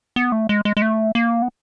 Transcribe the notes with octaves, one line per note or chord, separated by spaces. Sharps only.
B3
A3
G#3
G#3
G#3
A3
A#3
B3